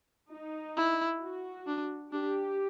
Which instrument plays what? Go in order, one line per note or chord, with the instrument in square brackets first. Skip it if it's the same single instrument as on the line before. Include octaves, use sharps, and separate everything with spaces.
[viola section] D#4
[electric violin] E4
[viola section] F#4
[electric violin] D4
[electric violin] D4 [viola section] G4